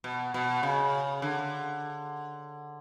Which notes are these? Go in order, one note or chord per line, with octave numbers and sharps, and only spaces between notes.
B2
B2
C#3
D3